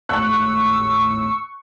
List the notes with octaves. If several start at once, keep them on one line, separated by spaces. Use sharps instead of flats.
G#1 D#2 A2 C#6 E6 F#6